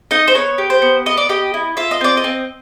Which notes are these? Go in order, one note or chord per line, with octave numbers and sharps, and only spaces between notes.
D#4 D#5
C5
B3 C#5
G4
C5
B3
B3 D#5
D5
G4 D#5
E4
F4 E5
D#5
C4 D5
D#5
C4